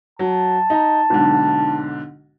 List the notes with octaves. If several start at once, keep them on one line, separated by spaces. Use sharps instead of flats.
F#3 A5
D#4 A#5
B1 G#2 D3